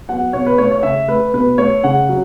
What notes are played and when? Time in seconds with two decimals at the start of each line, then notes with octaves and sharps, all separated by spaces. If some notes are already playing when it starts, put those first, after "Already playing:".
0.09 F#3 B3 F#5
0.33 B2 C#5
0.46 B4
0.58 A3 C#5
0.71 C#5
0.83 C#3 E5
1.08 A3 B4
1.33 B2 B4
1.58 A3 C#5
1.84 C#3 F#5
2.09 F#3